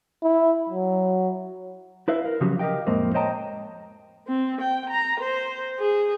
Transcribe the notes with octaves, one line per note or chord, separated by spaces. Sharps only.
E4
F#3
E4 B4 E5 F5
A#4
C#3 F3 F#3 C#4 F#4 G4
G4 A#4 B4 D#5 F5 G5
F2 A2 G#3 A#3 C4
C5 C#5 D#5 G5 A5 A#5
C4
G5
A#5
C5
G#4